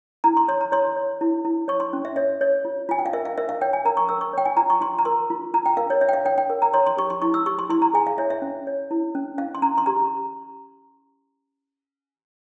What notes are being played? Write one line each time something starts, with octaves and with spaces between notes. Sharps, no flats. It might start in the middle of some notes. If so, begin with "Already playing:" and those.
E4 A#5
C6
C#5 C6
A#5
C#5 C6
C#5
E4
E4
C#5 C#6
C6
C#4
E5
C#5 E5
C#5
F4
F4 G#5
G5
F5
A#4 E5
F5
A#4 E5
F5
C#5 G5
G#5
A#4 A#5
C#6
A#4 E6
C#6
C#5 G5
G#5
F4 A#5
C#6
F4 C6
A#5
A#4 C6
F4
F4 A#5
G5
A#4 F5
C#5
C#5 E5
G5
F5
C#5 G5
G5
A#4
A#5
C#5 C6
C6
G4 C#6
C6
E4 C#6
E6
G4 C#6
C6
E4 C6
A#5
G#4 G#5
F5
C#5 E5
E5
C#4
C#5
E4
C#4
C#4 F5
C6
C#4 A#5
C6
G4 A#5